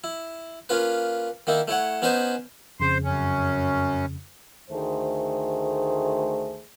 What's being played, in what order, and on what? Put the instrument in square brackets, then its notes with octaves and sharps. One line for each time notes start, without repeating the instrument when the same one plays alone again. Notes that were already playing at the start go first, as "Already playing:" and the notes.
[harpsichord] E4
A#3 C#4 F4 B4
D#3 A#3 D#4 E4
A3 E4 C#5 F#5
B3 C#4 D#4 B4 C5 G#5
[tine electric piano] F2 C#3 [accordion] C5
[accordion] F#2 C#4
[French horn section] D2 D#3 A3 G#4 C5